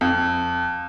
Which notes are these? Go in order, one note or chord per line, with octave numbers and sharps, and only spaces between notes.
F2